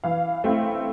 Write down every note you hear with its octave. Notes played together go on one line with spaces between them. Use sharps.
E3 F5
A3 C4 E4